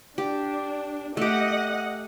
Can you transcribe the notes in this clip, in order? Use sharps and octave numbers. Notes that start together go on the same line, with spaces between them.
D4 G4
A3 G4 D#5 F#5